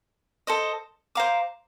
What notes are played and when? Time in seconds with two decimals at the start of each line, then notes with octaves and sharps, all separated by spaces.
0.47 A4 C5 D#5
1.15 C5 F5 A#5 D6